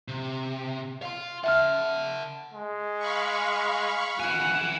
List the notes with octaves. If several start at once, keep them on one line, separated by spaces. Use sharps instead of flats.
C3
F5 C6
E5 F#5 A5 F6
G#3
F5 B5 C#6
E4 F#5 G#5